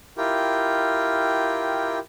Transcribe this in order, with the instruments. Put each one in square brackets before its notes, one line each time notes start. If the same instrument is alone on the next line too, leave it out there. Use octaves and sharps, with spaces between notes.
[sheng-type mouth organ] E4 F4 G4 A#4 G5